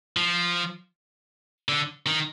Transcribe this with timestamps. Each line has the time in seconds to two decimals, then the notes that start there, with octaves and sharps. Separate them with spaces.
0.17 F3
1.69 D3
2.07 D#3